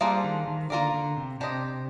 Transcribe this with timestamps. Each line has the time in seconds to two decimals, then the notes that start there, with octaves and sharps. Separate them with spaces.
0.01 F3 G3 A#3 D4 G#4 C5
0.24 D#3
0.47 D#3
0.70 D3 A#3 F4 A#4 D5
0.94 D3
1.17 C3
1.40 C3 D4 G4 C5 D#5